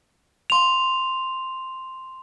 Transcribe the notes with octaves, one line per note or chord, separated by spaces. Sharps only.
C6 F7